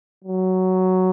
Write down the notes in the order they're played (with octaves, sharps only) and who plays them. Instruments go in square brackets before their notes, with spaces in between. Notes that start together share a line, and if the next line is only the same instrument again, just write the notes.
[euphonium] F#3